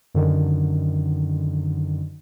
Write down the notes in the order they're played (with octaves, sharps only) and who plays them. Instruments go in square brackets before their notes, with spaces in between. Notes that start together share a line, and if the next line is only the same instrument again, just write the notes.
[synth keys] F#2 D3 D#3